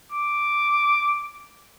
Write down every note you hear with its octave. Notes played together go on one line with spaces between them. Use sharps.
D6